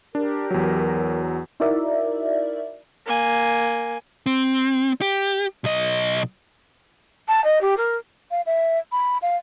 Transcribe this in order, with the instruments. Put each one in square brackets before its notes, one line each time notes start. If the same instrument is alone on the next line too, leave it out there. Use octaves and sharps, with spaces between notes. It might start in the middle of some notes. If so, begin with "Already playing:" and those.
[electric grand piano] D4 [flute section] G4 A#4
[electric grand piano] E2 F#3
[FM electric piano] D#4 E4 F#4 A#4 D5 E5
[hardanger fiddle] A#3 G#5
[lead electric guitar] C4
G4
B1 D#5
[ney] A5
D#5
G4
A#4
[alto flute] F5
E5
B5
F5